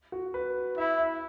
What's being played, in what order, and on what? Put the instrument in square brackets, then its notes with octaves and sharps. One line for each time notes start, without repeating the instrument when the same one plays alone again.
[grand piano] F#4
B4
[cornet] E4 [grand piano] E5
[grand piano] E5